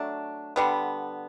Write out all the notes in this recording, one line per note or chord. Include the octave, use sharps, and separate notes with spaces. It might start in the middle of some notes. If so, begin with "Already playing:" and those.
Already playing: F#3 A3 D4
D3 G3 B3